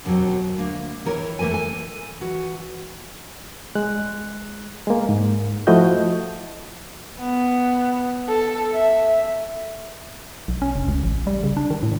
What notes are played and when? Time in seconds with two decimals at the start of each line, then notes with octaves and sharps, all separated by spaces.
0.05 D#2 B2 F3 F#3 C4
0.58 D2 A#3
1.05 D#3 E3 A#4 C#5
1.39 E3 A3 A#3 B4 G#5
1.51 A4 G#5
2.21 E3 F#4
3.75 G#3 F#6
4.87 G#3 A#3
5.09 G#2
5.67 F3 A3 E4 F#4 D#5 G6
7.20 B3
8.29 A4
8.74 E5
10.48 B1
10.62 C#4
10.76 F1
10.88 C#2
11.04 A1
11.27 G3
11.44 C#3
11.57 D4
11.70 D#3
11.83 A2